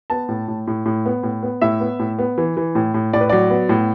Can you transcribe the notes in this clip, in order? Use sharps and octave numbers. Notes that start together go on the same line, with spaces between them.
B3 A5
A2
A2
A2
A2
B3
A2
B3
A2 E5
B3
A2
B3
E3
E3
A2
A2
A2 D5
B4
F#3 D5
B3
A2